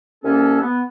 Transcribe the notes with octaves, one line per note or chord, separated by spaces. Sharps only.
C2 A#3 C#4 A4
B3